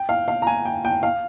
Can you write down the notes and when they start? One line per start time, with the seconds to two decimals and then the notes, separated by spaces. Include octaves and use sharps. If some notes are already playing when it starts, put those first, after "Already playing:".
Already playing: G5
0.09 F5
0.28 F5
0.42 A#5
0.47 G#5
0.65 G5
0.85 G5
1.03 F5